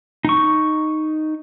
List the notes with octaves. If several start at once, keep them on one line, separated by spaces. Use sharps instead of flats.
D#4 C#6